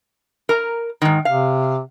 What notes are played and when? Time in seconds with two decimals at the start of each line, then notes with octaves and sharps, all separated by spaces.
0.49 A#4 A#5
1.02 G#2 D#3
1.25 C3 F5